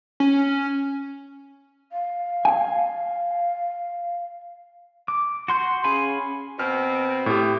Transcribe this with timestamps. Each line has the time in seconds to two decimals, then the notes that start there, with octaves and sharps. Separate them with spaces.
0.20 C#4
1.92 F5
2.45 G#5
5.08 D6
5.48 F#4 C6 G6
5.84 C#4 G#4 F5 G#5 B5
6.59 B2 C4 F6
7.26 A2 G4